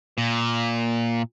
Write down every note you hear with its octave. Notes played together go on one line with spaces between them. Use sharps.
A#2